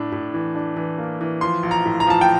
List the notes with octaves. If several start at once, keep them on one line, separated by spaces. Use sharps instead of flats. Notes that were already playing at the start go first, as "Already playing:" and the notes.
Already playing: A2 D4
A2
E3
D4
E3
A#3
E3
F3 C6
A#1
A#5
A2
A#5
F3 A5
G5